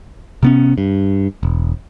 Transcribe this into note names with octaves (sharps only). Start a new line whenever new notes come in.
C3 B3 C#4
G2
E1